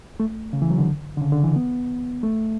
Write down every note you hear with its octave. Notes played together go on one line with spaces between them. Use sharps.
A3
C#3
E3
F#3
D3
D3
C#3
D3
E3
B3
A3